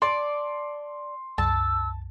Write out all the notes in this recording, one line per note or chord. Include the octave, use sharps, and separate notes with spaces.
D5 A5 C6
C2 F#2 A5 E6